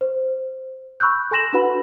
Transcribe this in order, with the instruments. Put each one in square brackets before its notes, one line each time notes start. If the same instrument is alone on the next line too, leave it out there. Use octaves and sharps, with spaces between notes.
[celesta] C5
B5 C#6 E6 F#6 G6
A4 G#5 C6 A#6 E7 F#7
D4 E4 F#4 B4 F#5 B5